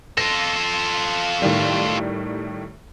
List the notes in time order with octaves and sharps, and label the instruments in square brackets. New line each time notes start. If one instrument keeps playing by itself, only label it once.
[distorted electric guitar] F4 A4 [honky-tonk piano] A#6
[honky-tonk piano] A2 D#3 G3